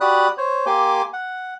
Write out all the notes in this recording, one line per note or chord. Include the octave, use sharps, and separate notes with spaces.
F#4 G4 D5 B5 D#6 F#6
C5 C#5
A#3 G4 G#5 C6 D6
F#5